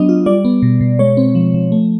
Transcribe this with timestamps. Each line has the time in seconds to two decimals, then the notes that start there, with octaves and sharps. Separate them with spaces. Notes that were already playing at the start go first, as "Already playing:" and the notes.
Already playing: F#3 B3 D4 D#5
0.09 F4
0.26 G3 D5
0.45 B3
0.62 B2
0.81 B2
0.99 G#3 C#5
1.17 C4
1.35 F3
1.54 F3
1.72 A3